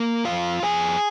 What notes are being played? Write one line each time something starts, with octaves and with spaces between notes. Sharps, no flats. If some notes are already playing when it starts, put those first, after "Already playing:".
Already playing: A#3 A#4
F2 F4 F5
F2 G#4 G#5